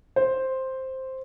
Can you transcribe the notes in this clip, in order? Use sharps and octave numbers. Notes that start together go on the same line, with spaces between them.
C5